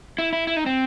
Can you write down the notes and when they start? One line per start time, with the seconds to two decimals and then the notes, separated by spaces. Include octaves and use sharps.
0.18 E4
0.33 E4
0.47 E4
0.57 D#4
0.66 C4